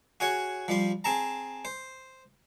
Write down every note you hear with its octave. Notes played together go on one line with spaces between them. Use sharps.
F#4 G#4 C#5 F#5
F3 G3 C6
C4 G#4 A5 A#5
C5